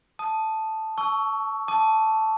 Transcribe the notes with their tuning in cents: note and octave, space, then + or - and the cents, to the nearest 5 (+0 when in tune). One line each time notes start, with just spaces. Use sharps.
A5 +0 D#6 -10
A5 -30 C#6 +15 E6 -5
A5 +0 D6 +35